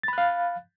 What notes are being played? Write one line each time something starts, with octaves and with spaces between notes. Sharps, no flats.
F5 B5 F#6 A6